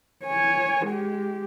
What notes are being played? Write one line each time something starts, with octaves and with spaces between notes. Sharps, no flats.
C#5 G#5
G#3 G4